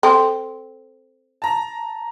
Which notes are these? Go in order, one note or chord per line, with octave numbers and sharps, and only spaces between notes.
C4 A4 G5
A5 A#5